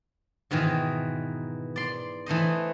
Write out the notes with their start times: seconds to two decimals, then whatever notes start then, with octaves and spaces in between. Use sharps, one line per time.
0.51 G#2 B2 D#3 E3
1.76 D5 C6
2.26 E3 A3 C5 D#5